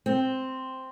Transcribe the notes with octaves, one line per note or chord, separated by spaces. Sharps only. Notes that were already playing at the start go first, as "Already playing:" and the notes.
C4